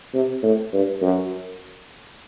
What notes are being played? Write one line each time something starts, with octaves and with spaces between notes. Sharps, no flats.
C3
A2
G2
F#2